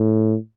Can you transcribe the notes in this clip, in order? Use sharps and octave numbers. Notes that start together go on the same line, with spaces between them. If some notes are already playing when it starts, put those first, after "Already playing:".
Already playing: A2